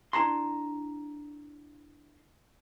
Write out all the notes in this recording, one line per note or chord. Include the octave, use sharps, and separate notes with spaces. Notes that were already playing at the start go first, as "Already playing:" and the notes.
D4 E4 A5 A#5 C6